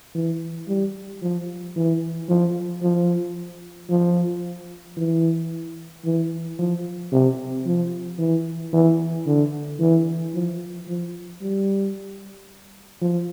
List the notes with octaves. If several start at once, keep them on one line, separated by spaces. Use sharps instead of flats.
E3
G3
F3
E3
F3
F3
F3
E3
E3
F3
C3
F3
E3
E3
D3
E3
F3
F3
G3
F3